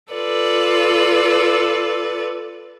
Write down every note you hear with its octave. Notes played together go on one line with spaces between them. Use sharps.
F4 A4 B4 D5